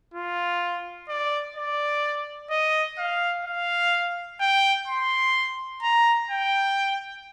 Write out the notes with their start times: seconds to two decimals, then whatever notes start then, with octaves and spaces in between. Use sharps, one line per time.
0.14 F4
1.09 D5
1.56 D5
2.50 D#5
2.98 F5
3.45 F5
4.40 G5
4.88 C6
5.83 A#5
6.31 G5